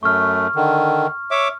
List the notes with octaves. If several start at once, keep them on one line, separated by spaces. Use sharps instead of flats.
F#2 A3 C#6 F6
D3 D#3
C#5 E5 D6